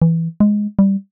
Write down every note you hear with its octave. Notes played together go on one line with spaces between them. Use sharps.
E3
G#3
G3